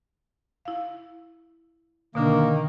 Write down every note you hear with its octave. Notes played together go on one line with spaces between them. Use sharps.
E4 F5
B2 D3 D#3 A#3 D4